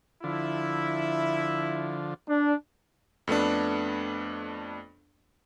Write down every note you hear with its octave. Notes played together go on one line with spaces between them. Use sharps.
D3 F3 E4
D4
F2 A3 B3 D4